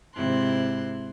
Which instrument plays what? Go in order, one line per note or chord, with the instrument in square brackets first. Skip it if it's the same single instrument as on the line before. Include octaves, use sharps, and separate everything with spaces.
[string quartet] G#2 C3 E4 C6 F#6